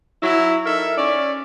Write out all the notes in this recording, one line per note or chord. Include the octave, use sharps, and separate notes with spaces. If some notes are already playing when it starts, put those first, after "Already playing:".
F#3 E4
D#4 A4 A#4 E5
C#4 D5